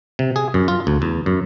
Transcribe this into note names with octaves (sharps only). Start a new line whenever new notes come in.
C3
G#4
F#2
F4
D2
E2
F#2